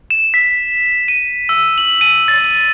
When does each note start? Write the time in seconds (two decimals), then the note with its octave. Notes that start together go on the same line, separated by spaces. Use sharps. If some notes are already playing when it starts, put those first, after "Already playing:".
0.10 E7
0.34 B6
1.08 D#7
1.49 E6
1.78 F#7
2.01 D#7
2.28 A6